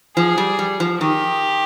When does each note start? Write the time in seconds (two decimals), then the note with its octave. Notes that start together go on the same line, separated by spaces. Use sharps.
0.16 F3 G#4
0.38 G3
0.59 G3
0.80 F3
1.00 D#3 G4